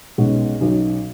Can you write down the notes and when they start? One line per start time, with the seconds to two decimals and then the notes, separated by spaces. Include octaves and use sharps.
0.18 B1 B2 G#3 C#4 F#4
0.61 B1 B2 F#3 C#4